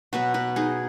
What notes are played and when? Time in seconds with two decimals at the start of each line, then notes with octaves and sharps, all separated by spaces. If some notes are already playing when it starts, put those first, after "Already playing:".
0.13 B2 F#3 B3 F#4 B4
0.34 F#4 B4
0.56 D#4 G#4